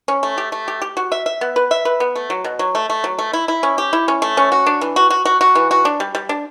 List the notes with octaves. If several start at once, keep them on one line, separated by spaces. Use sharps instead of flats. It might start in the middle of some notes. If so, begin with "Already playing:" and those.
C#4
A3
G4
A3
G4
G4
F#4
E5
E5
B3
B4
E5
B4
B3
A3
F#3
B2
F#3
A3
A3
F#3
A3
E4
E4
C#4
G4
E4
C#4
A3
C#4
F#4
D4
E3
F#4
F#4
F#4
F#4
E3
F#4
D4
G3
G3
D4